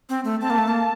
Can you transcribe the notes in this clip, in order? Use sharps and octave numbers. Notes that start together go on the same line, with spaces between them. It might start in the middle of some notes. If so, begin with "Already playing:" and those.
C4
A3
C4 A5
A#3
A3
A#3